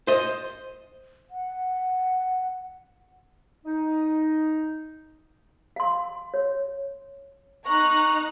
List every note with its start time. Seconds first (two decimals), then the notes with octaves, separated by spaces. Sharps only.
0.07 C5 D#5
1.30 F#5
3.65 D#4
5.76 F5 C6
6.34 C#5
7.66 D#4 A#5 C#6 F#6